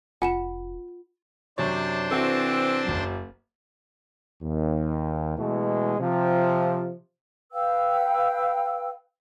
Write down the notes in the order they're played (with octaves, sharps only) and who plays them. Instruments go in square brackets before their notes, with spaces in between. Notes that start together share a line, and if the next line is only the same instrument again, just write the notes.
[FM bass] F1 [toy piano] F4 [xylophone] F#5 C#7 E7 [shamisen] G#5
[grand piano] F#2 C3 C#5 [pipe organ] D4 C5 A5
[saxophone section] C3 E3 C4 [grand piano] E4 F#4 A4
[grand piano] F#1 F#3
[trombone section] D#2
B2 E3 G#3 A3
C3 F3
[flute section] B4 F5 G5 E6